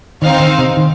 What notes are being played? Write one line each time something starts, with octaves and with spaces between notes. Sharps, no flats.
D#3 C4 D#4 C5 F5
D#3
C3
D#3